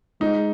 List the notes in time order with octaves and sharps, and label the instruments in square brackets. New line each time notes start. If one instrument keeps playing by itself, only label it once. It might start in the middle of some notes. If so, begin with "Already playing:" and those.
[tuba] G#3 [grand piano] D#4